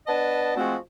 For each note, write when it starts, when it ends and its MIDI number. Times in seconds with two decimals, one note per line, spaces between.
0.07 0.56 59
0.07 0.56 62
0.07 0.56 71
0.07 0.56 75
0.07 0.56 81
0.57 0.75 53
0.57 0.75 56
0.57 0.75 57
0.57 0.75 60
0.57 0.75 66